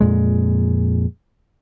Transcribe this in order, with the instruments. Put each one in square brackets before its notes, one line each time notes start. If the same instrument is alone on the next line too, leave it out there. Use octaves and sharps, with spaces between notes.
[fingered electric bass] F2 A#2 G#3